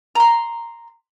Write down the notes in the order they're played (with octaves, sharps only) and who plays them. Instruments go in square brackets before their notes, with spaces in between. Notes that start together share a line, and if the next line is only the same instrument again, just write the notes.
[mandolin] A#5 C6